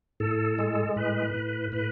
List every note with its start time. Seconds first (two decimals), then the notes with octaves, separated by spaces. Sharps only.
0.20 A2 A4
0.58 G#3
0.96 A2 B4
1.34 A2
1.72 A2 B4